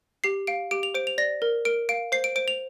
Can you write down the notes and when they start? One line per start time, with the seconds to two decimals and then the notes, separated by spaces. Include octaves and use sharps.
0.24 G4 C7
0.47 F5 D7
0.71 G4 D7
0.83 F7
0.94 C5 D7
1.07 F7
1.18 D5 A#6
1.42 A#4
1.65 A#4 D7
1.89 F5 D7
2.12 C5 C7
2.24 D7
2.36 C5 D7
2.48 F7